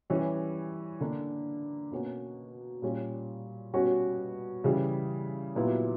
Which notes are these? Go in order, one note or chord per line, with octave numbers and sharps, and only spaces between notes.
E3 G3 C#4 G4
D3 A#3 D4
B2 A#3 C#4 F#4
A#2 G3 C#4
B2 G3 C#4 F#4
C#3 E3 G3
A#2 F#3 B3 E4 G4